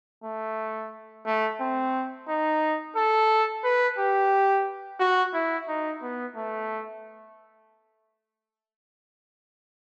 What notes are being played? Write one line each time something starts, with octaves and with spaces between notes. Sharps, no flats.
A3
A3
C4
D#4
A4
B4
G4
F#4
E4
D#4
B3
A3